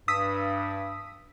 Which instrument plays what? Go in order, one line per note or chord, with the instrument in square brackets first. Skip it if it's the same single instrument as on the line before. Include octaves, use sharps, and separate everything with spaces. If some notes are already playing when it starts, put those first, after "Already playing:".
[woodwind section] G2 [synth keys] D#6 E6 B6